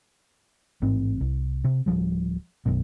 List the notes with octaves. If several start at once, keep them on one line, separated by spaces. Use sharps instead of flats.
A1 G#2 C4
C2
C3
D1 C#2 F3 G3
B1 F#2 B2